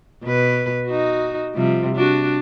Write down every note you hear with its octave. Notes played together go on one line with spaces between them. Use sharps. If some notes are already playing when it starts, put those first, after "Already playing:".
B2 B4
D#4 F#4
C3 F3 G3
D4 F#4